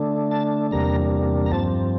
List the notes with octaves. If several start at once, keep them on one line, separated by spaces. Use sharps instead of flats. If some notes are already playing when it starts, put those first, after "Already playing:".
Already playing: D3 A3 D4
A5
E2 C3 G3 A#3 D4 A#5
A#5
G2 F3 C4 A5